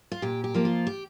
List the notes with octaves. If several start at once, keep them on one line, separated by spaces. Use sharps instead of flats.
F4
A#2 G4
G4
F3 A#3
F4
G4